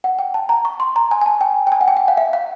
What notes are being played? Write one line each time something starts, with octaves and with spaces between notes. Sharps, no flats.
F#5
G5
A5
A#5
C#6
C6
A#5
G#5
G#5
A5
G5
G5
G#5
F#5
G5
F#5
F5
E5
F5